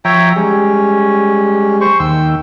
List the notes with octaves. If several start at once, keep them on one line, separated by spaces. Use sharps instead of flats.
F3 C#5 E5 G5 A#5
G3 G#3 C#4
C5 C#6
D#2 G5 E6